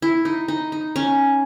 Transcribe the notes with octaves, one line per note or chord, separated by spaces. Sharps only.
E4
D#4
D#4
D#4
C#4